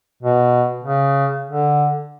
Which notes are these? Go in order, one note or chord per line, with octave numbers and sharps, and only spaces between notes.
B2
C#3
D3